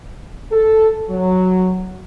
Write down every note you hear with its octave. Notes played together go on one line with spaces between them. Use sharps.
A4
F#3